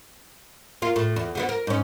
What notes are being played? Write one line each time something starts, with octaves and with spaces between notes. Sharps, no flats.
A#3 F4
A2
E2
D3 A3 B3
A#4
G#2 C#4